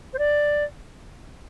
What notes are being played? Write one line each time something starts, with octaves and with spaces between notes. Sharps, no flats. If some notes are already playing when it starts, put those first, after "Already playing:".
C5
D5